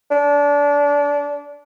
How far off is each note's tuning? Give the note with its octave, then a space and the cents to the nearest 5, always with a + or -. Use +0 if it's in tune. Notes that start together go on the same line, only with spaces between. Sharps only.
D4 -25